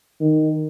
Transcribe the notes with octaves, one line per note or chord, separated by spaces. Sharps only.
D#3